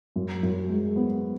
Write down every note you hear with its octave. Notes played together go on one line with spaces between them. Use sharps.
F#2
F#2
G#3
B3